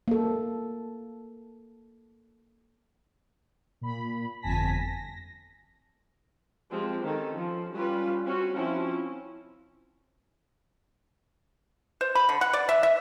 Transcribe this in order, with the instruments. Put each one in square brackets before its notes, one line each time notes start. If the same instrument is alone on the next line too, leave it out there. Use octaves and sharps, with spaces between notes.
[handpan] A#3 A4
[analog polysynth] A#2 B5
G1 F2 G#5 A5 A#6 B6
A#6
[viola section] F3 G#3 C4 G4
D#3 C#4 D#4 A4
F3
G3 C#4 F4 B4
C4 C#4 F#4
F3 C4 C#4 E4
[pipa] C5
B5
D3
F#5
D5
E5
E5